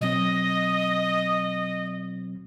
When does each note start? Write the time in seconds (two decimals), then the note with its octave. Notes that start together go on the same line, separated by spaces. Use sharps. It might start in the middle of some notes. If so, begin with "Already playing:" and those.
0.01 B2 F#3 C4 D#5